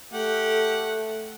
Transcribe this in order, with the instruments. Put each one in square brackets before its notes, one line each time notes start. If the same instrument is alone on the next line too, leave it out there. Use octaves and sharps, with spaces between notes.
[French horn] A3 [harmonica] G4 F#5 [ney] A4